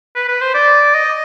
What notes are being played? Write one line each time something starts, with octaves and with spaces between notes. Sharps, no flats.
B4
B4
C5
D5
D#5